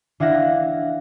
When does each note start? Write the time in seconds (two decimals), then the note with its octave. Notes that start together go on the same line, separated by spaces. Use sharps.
0.20 E3 D4 E4 F5 F#5 A#6